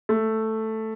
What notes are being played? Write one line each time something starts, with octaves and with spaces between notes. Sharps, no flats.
A3